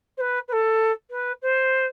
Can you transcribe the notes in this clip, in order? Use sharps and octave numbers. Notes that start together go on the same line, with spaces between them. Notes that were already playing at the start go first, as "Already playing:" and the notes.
C5
B4
B4
A4
B4
C5